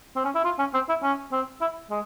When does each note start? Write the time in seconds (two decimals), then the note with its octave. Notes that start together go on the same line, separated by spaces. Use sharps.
0.16 C4
0.25 C#4
0.35 E4
0.45 F4
0.59 C#4
0.74 C4
0.89 E4
1.03 C#4
1.32 C4
1.61 E4
1.90 G#3